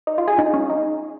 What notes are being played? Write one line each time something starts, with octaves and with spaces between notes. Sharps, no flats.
D#4
F4
G#4
D#4
C#4
D#4